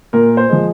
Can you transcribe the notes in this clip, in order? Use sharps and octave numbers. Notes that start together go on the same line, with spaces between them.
A#2 A#4
C5
F3 G#3